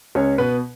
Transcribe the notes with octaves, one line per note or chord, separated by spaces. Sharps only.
C#2 C#4 C#5
B2 B3 B4